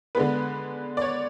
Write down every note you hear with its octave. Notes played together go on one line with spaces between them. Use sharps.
D3 G#3 B3 B4
D5
C#5